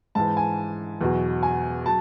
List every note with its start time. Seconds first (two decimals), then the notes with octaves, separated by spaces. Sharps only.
0.15 G#2 E3 A5
0.37 G#5
1.01 E2 B2 F#3
1.43 G#5
1.86 F#3 A5